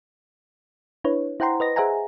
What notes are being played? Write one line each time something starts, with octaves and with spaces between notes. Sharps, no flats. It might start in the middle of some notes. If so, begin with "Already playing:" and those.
D4 E4 B4 C#5
E4 C5 F#5 G5 A#5 C6
B4 D#5 A#6
G#4 C5 E5 F#5 G#5 A#5